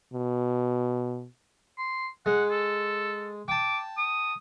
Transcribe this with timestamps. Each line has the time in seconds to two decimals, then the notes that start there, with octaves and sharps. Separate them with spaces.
0.14 B2
1.78 C6
2.26 G#3 F#5
2.51 A4
3.48 G5 A5 D6
3.98 D#6